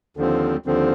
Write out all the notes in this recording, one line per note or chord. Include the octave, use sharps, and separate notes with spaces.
D#2 D3 F3 C4
D#2 D3 F3 C4